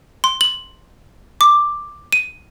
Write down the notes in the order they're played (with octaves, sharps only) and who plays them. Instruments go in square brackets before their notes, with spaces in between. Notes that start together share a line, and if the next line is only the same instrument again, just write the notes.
[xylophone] C6
F#7
D6
D#7